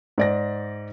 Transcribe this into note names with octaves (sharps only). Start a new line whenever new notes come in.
G#2 D5 A#6